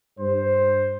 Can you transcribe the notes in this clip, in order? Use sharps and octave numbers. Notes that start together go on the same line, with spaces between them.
G2 C5